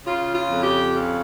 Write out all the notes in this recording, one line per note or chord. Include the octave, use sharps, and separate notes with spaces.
C#3 F4
F4
F2
G4
C#3